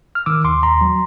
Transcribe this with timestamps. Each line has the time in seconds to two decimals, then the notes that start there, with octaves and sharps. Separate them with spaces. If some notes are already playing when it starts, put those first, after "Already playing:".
0.15 F6
0.26 D#3 D6 E6
0.44 D#2 C6 D6
0.63 D#2 A#5 C6
0.81 F#3